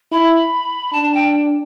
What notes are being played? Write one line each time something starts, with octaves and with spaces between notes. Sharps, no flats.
E4 B5
D4 A5
G5